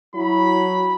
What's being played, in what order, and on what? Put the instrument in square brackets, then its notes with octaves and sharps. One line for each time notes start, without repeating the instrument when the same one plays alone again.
[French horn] F#3 [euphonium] E4 [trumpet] B5